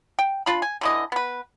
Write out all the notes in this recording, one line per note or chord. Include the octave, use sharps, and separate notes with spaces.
G5
D4 F4 B5
G#5
D3 E3 D#5
B3 B4